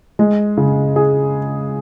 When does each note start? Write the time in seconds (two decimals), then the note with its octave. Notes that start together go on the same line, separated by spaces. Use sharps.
0.19 G#3
0.57 C#3
0.96 G#4